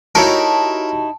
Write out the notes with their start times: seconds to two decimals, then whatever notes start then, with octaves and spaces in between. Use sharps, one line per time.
0.15 D#4 E4 F#4 G4 A#4 C#5 A5